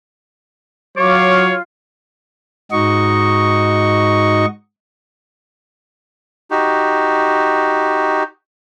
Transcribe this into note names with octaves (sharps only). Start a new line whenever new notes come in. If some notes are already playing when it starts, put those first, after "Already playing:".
F#3 F4 C#5 C#6 D6
G#2 D#4 F#4 D#5 C#6
D#4 F#4 G4